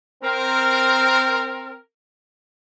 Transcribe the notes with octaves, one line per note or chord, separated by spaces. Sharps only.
C4 A#4